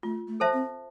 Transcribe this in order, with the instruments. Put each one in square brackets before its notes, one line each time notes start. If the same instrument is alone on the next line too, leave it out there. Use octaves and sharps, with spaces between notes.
[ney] A3 [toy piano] F4
[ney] A3
[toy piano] A4 C5 E5 A5
[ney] C4